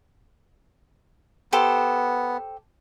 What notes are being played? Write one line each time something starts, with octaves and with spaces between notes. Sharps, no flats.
B3 G4 A4 C5